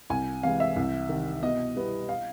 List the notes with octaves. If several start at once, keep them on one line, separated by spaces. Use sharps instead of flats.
C2 G#5
C3 E3 G#3 F5
E5
C2
C3 D#3
B2 D#5
G3 B3 E4
F5